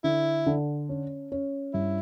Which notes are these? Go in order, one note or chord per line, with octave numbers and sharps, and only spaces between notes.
D3 E4
D3
C#4
C#4
G2 E4